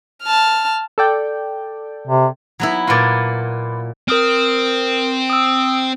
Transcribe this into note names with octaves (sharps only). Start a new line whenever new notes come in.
A5 F6
A4 D5 G5
C3
F#3 B3 E4
A#2 F4 F#4 B4 D5
C4 A#4 D#6 F6
D#6 E6